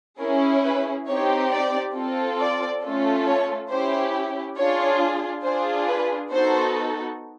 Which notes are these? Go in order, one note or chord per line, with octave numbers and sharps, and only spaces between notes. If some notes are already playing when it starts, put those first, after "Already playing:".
C#4 E4 G#4 A#4
B4
C4 D#4 G4 C#5
D5
C4 F4 A4
D5
A3 C#4 F4 A4
C#5
C#4 E4 G4 C5
D4 F4 G#4 C#5
D4 F4 G#4 C5
B4
B3 D#4 F#4 A4 C5